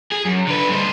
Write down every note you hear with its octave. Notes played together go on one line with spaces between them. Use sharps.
G#4
F#2
D3 B4
G2 C5